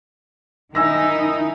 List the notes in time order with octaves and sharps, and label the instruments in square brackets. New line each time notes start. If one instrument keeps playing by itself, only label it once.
[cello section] D#3 D#4 E4 [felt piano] G#5 E6 A#6